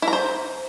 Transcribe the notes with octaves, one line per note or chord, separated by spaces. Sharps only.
E4
A#5
C5